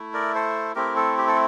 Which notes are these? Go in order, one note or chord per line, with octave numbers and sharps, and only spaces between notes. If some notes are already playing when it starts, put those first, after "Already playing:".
Already playing: A3 E4
A#4 D5
A4 C5
A3 C4 E4 G4 A#4
A4
G4
A4